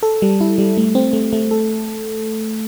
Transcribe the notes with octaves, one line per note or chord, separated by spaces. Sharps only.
A4
G3
E4
G3
A3
C4
A3
A3
A4